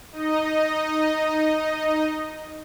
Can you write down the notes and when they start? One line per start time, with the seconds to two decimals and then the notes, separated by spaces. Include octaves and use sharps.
0.12 D#4 D#5